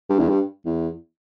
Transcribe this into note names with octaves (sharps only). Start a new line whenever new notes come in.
G2
E2
G2
E2